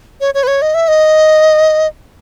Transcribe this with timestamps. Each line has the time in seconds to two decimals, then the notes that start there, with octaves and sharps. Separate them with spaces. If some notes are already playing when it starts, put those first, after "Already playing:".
0.21 C#5
0.34 C#5
0.43 B4
0.47 C#5
0.62 D#5
0.74 E5
0.88 D#5